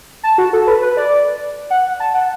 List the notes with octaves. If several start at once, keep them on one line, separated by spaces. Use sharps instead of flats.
A5
F#4
A4
B4
B4
D5
F#5
A5
F#5